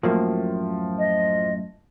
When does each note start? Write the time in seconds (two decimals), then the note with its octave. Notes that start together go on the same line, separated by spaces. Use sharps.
0.03 F#2 A2 F3 A#3
0.98 D#5